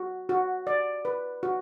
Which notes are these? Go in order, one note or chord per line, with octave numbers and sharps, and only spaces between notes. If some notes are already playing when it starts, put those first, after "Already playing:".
Already playing: F#4
F#4
D5
B4
F#4